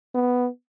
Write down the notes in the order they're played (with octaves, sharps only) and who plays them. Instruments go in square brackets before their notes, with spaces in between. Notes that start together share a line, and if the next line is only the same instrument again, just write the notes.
[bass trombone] B3